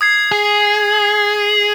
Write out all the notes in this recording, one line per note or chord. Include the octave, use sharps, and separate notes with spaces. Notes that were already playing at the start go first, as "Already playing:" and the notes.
D#6 G#6 C7
G#4